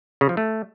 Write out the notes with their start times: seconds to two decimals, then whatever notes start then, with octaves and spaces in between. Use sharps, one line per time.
0.21 C#3
0.29 F3
0.37 A3